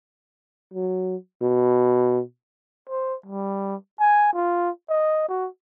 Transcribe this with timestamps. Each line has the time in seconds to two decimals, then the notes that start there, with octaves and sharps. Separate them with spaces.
0.74 F#3
1.42 B2
2.90 C5
3.26 G3
4.00 G#5
4.34 F4
4.90 D#5
5.29 F#4